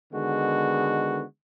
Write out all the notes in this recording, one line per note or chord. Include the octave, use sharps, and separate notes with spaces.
D3 D#3 G#3 B3 F#4